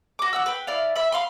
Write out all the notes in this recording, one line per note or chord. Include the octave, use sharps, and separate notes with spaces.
F#4 D6
F#4 F#5 E6
B4 G5
E4 D5 F5
E5 B5
F5 B5 C6